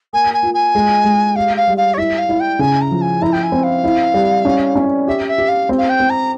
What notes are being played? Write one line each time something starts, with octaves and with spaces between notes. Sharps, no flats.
A#3 G#5
G#5
F4
G#5
G#3
G#3
G4 F5
F5
G3
F5
C#5
E4 E5
F5
E4
G5
C#3 G#5
A#5
F3
G#5
E4 A#5
G5
G#5
C4
F5
E4
G3
C#4
C#4
G4 E5
E5
G4
F5
C4
F5
G5
C4
A#5